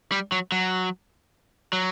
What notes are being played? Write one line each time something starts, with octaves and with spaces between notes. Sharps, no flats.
G3
F#3
F#3
F#3